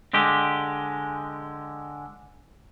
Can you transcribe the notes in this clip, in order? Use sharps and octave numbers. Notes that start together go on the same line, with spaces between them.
D3 G#3 G4